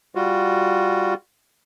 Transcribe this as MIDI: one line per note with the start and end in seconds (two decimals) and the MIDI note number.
0.15 1.14 55
0.15 1.14 65
0.15 1.14 66